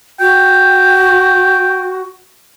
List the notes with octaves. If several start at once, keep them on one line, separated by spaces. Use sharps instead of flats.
F#4 G5